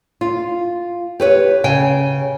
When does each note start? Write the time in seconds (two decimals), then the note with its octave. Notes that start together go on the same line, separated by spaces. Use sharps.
0.21 F4
1.20 G4 B4 C#5
1.64 C#3 G5 G#5